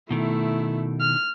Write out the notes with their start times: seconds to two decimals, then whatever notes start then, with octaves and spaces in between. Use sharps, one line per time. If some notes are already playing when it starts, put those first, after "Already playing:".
0.11 B2 D#3 A3 E4
1.01 F6